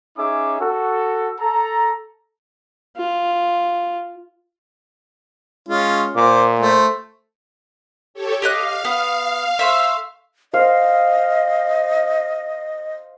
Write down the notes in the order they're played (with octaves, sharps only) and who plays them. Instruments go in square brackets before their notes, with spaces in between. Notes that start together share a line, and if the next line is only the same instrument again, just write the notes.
[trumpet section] C#4 D#4 G#4 E5 D6
F#4 A4
A4 A#5
[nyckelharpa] F4
[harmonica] G#3 C#4 F4
[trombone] A#2 [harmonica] C5 D6
[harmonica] A3 C5
[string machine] G4 A4 C#5
[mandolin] G4 D#5 F#6 [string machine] F5
[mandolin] B3
A3 C5 E5
[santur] C5 F5 [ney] D#5